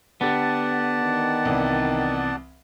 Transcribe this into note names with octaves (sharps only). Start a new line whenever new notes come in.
D3 B3 G4 A4 D5 F#5 A5
D#3
C2 E3